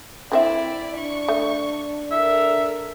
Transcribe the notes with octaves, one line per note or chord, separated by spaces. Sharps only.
D3 C4 E4 D5 E5
D4 C#6
A3
A4 A#4 E5